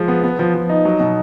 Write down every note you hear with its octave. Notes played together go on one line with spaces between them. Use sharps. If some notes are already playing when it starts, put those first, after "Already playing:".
Already playing: F3 G#3
B3
B3
F3
F3
D#4
F#3
B2